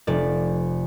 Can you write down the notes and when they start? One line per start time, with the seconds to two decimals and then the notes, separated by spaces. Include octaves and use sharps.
0.07 F1 D5